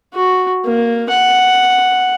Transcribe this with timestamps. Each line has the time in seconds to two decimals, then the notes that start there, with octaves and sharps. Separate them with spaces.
0.14 F#4
0.65 A#3
1.10 F#5